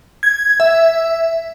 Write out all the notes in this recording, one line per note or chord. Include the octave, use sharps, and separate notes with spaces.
G#6
E5